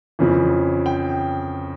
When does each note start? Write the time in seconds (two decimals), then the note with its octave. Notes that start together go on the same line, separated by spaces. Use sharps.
0.19 F2 C#3 E3
0.86 G5